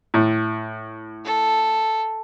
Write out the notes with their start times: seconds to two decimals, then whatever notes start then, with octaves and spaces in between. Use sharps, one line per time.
0.14 A2
1.25 A4